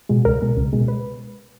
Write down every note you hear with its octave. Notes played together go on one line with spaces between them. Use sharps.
B2 G#3
C#2 A#4
B2 G#3
C#2
B2 G#3
B4